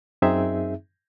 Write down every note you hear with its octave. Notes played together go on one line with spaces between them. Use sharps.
F#2 C4 D#4 G#4 E5